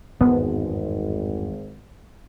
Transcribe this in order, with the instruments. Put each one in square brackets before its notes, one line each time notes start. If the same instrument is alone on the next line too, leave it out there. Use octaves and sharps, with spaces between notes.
[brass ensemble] G#1 [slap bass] E2 G2 G#3 [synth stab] B3